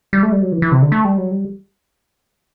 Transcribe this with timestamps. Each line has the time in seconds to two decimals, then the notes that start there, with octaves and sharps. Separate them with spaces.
0.13 G3
0.23 A3
0.32 G3
0.42 F#3
0.52 E3
0.62 E3
0.72 C3
0.82 D3
0.92 A3
1.05 G3
1.18 F#3
1.31 G3